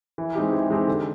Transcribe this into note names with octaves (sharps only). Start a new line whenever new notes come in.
E3
G#3 C4 D#4 G4
E3
G#3 C4 D#4 G4
D3